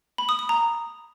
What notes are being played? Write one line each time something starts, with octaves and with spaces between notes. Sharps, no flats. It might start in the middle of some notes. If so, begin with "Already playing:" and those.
B5
D#6
D#6
A#5